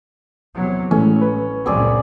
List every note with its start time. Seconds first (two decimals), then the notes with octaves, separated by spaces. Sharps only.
0.55 E2 C3 F#3
0.91 A1 E3 G#3 A3 C#4
1.22 B4
1.66 C#2 F#2 A#2 C4 G#4 D5